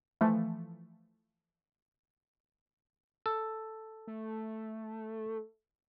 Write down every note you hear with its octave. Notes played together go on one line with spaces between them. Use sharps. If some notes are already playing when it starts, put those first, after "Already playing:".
E3 F3 A3
A4
A3